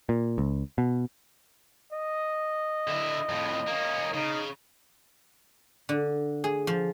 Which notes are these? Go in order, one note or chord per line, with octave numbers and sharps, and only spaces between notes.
A#2
C#2
B2
D#5
D3 E4
F2 A2
A#3 C#4
C#3 D#4
D3
G#4
F3